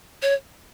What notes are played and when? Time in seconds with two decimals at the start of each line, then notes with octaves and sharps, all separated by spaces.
0.22 C#5